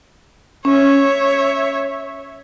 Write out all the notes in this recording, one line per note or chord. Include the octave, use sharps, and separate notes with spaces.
C#4 C#5 E5